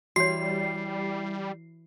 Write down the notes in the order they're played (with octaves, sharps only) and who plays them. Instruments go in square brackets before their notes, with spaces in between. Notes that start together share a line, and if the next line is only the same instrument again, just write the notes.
[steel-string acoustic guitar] E3 [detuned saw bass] G3 [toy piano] F#4 C#5 [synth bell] C7